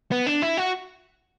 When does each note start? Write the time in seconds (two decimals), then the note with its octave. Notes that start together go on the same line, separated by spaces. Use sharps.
0.11 B3
0.27 D4
0.42 E4
0.57 F#4